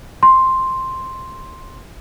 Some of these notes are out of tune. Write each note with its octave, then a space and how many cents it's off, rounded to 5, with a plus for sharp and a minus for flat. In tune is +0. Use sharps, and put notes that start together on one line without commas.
C6 +5